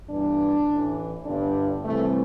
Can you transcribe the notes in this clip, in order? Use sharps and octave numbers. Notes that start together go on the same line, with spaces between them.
G1 G2 E3 D4
A1 A2 E3
G1 G2 D3 D4
C2 C3 E3 A3